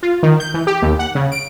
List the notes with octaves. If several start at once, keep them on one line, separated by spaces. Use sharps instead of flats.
F4
D#3
G6
E3
G4
D#2
F#5
C#3
D7